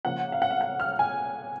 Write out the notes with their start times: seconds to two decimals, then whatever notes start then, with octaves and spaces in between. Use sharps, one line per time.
0.05 C#3 F3 A#3 F#5
0.32 F5
0.42 F#5
0.51 F5
0.61 F#5
0.80 F6
0.99 G#5